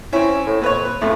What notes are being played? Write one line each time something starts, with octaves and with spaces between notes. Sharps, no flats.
C4 C#4 E4
A2
F2 A#2 B4 C#5
B4
F2 A2 C#3 A3